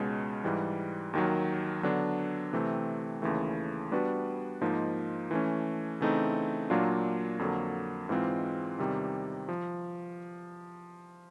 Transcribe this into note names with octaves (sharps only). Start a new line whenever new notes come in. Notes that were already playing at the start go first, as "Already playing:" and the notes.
Already playing: C#2 B2 G#3 C#4
G#2 E3 G3
D#2 D#3 F#3
D3 F#3 B3 D4
C3 E3 A3 C4
D#2 C#3 E3 A3
G3 B3 D4 F#4 B4
G#2 F3 A#3 D#4
E3 A3 C#4
C#3 E3 A3 C4 D#4
A#2 F#3 A#3 D4 F4
F2 D3 F#3 A#3
G#2 E3 G#3 C4 F4
E2 C3 D#3 G3
F3